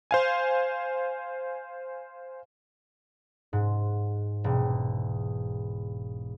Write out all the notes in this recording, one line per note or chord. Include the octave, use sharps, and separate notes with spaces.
C5 F5 G#5
G#2
E1